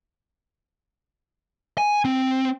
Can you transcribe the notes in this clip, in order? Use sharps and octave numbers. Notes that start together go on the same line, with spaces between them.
G#5
C4